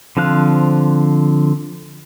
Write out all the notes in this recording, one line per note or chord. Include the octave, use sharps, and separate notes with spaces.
D3 F3 C4 F5 F#6